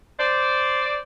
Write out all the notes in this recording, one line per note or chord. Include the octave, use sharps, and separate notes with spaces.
C5 D5